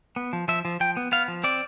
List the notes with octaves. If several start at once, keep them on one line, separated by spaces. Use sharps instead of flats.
B3
F3
F3 E5
F3
F3 G5
B3
B3 F5
F3
C4 D5